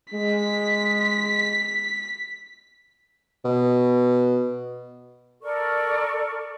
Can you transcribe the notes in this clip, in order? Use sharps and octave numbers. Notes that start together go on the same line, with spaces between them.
G#3 B6
B2
A4 A#4 D5 C#6